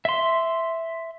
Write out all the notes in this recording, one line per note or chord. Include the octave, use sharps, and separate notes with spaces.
E5 C6